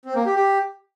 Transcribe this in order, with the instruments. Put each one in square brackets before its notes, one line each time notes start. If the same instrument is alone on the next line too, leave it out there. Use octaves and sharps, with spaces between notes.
[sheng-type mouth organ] C4
A#3
G4
G4